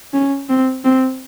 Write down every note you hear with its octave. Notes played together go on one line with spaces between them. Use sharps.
C#4
C4
C4